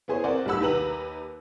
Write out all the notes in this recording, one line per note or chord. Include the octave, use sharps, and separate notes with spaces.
B3 E4 G#4 C5 C#5
C4 A#4 C5 D5 F#5
B1 G3 A3 F#5 B5 E6
D#2 D#4 G4 B4 A#5 F#7